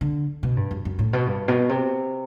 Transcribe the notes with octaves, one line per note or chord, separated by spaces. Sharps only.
D3
B2
G2
F#2
F#2
A2
B2
G2
B2
C3